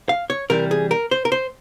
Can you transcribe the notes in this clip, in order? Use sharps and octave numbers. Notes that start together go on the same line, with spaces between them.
F5
C#5
C3 E3 G3 A#4
G#4
A#4
C5
A#4
C5